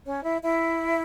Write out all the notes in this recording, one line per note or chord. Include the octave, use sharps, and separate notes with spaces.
C#4 C#5
E4 E5
E4 E5